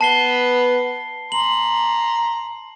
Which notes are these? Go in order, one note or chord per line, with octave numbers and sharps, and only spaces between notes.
B3 B4 A5 C7 G7
A#5 C6 F#7